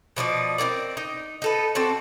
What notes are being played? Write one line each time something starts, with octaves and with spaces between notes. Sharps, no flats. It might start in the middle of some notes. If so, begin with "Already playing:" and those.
B2 F3 D#4 D5
C4 E4 A#4 D5
D#4
D#4 A4 B4
C4 F#4 A4 D5